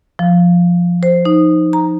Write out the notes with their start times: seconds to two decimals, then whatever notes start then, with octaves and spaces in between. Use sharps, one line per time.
0.19 F3
1.03 C5
1.25 D#4
1.73 A#5